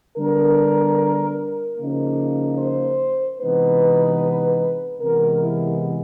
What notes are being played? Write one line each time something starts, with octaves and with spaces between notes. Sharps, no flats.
D3 G3 B3 D4 A#4
C#3 F3 A#3 D#4
C5
C3 E3 G#3 B3 D#4 B4
C3 E3 G#3 B3 A#4
E4